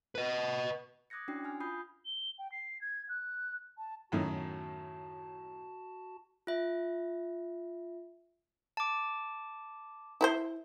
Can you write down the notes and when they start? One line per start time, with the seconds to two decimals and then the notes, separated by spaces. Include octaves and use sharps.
0.15 B4 D#5
1.10 D6 D#6 F#6 G#6 A#6 C#7
1.28 C#4 D4 E4 F#4 G5 C7
1.44 G#5 F6
1.60 F4 B5 D#6 G6 C7
2.06 G7
2.39 G5
2.52 C7
2.81 G#6
3.09 F#6
3.78 A5
4.12 F#2 A2 D#3 F#4 A5
6.47 F4 E5
8.77 A5 D6
10.21 E4 B4 C5